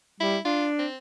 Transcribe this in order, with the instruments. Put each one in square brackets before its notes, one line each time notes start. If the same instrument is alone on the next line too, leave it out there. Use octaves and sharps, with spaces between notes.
[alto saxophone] G3 [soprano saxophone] E4
[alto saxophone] D4 [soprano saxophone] F4
[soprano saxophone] C4